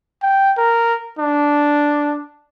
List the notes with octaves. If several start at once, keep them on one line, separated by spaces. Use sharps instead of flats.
G5
A#4
D4